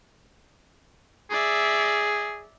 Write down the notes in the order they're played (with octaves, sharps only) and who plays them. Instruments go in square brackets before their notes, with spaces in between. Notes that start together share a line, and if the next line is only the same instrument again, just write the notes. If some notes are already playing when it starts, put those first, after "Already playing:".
[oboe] G#4 [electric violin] D5 E5